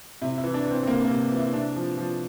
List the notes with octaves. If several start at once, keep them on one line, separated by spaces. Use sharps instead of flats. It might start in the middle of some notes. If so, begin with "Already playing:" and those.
C3 E4
E4
E3
D4
E3
C4
C4
C3 A#3
A#3
C3
E3
E4
C3 D4
F3
F3